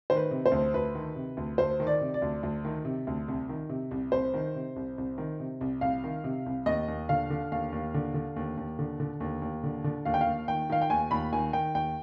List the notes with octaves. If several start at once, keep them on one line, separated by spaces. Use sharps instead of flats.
D#3 C5
B4
C3
C5
D2
D2 B4
D#3
C3
D2
D2 C5
D#3
D5
C3
D5
D2
D2
D#3
C3
D2
C2
D#3
C3
C2
C2 C5
D#3
C3
C2
C2
D#3
C3
C2
C2 F5
D#3
C3
C2
D#2 D#5
D#2
D3 F5
D3
D#2 F5
D#2
D3
D3
D#2
D#2
D3
D3
D#2
D#2
D3
D3
D#2 F5
G5
F5
D#2
D#3 G5
D#3 F5
G5
D#2 G#5
D#2 B5
D#3 G#5
D#3 G5
D#2 G5